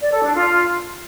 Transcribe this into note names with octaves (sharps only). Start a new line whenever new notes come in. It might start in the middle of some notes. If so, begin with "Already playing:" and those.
D5
A4
D4
F4